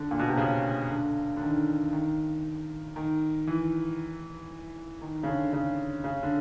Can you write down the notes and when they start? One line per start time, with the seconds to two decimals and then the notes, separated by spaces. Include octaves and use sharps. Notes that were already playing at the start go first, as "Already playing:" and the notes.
Already playing: D3
0.11 A#2
0.19 B2
0.29 C3
0.38 C#3
0.90 D3
1.37 D3
1.42 D#3
1.93 D#3
2.96 D#3
3.47 E3
5.02 D#3
5.23 C#3
5.27 D3
5.53 C#3
6.04 C#3
6.23 D3